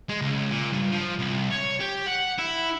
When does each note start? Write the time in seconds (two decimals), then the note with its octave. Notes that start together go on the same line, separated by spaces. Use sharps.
0.09 G#3
0.21 C#2
0.51 A#2
0.73 G2
0.92 F3
1.19 C2
1.51 C#5
1.80 G4
2.06 F#5
2.39 E4